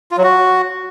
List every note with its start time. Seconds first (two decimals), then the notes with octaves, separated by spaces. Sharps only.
0.11 F4
0.17 F#3
0.24 F#4